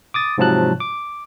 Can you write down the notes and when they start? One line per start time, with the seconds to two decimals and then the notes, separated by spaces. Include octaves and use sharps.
0.14 D6 D#6 A6
0.38 G#2 C3 F3 F#3 A5 F#6
0.80 D6